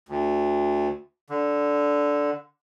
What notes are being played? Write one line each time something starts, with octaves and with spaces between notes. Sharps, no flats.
D2
D3